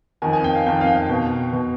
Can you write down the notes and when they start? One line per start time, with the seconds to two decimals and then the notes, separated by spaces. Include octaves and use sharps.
0.22 F2 D#3 G#5
0.33 G#5
0.44 G5
0.55 F5
0.66 F2 D#3 G5
0.81 F5
0.87 G5
0.95 F5
1.09 B2
1.53 B2